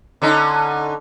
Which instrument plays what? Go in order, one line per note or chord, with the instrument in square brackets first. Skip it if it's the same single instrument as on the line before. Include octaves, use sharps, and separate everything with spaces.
[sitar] D3 C#4 D#4